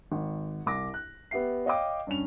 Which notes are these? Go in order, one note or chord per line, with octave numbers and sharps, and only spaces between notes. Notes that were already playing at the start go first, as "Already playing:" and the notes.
G#1
C2 D6 A#6
F#6
B3 G4 E5 C7
C#5 D#5 F5 G5 D6
G2 C#4 F7